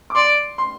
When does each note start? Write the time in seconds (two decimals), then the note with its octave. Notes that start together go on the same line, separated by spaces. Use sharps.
0.10 D6
0.15 D5 C6
0.58 C6